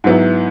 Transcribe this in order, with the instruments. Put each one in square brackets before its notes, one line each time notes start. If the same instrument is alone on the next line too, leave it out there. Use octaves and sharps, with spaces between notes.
[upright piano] G#2 F#3 B3 E4